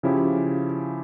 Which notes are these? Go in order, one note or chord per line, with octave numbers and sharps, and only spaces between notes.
C#3 F3 C#4 E4 G4